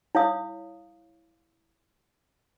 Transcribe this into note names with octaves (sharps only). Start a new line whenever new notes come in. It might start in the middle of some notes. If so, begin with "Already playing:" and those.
E4 C#5 F5 D#6